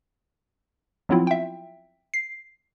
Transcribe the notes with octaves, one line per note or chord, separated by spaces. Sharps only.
F3 F#3 B3 C4 E4 F4
E5 G5
C7